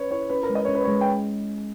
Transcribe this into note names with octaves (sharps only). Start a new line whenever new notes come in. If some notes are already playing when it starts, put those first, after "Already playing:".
Already playing: C#4 B4 C#5
E4 C#5
C#4 B4
A#4
G#3
D#5
C#4 C#5
B4
G#3 C#5
G5